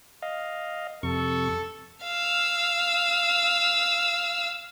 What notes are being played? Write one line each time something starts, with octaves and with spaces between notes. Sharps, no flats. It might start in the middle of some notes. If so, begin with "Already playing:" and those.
D#5 F5
F2 C3 A4 C#6
F5 E6